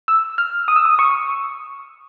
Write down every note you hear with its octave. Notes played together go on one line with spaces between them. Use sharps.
E6
F6
D#6
E6
D#6
C#6